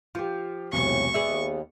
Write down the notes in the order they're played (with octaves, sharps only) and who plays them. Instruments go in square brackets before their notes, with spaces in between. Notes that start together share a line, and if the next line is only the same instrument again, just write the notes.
[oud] F3 [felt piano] F4 G4
[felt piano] E1 B1 C3 [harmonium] A2 [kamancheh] C#6
[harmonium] D#2 [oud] B3 G#4 E5 [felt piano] D5